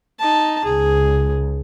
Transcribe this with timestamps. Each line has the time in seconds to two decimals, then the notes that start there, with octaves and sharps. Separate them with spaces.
0.19 D#4 A5
0.65 C#2 G#4